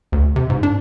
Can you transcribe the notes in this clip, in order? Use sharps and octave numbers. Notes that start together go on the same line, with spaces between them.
D2
C3
G#2
D4